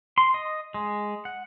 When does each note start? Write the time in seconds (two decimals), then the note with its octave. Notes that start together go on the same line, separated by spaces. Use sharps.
0.18 C6
0.34 D#5
0.74 G#3
1.25 F#5